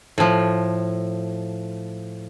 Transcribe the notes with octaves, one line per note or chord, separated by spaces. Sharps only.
A2 F3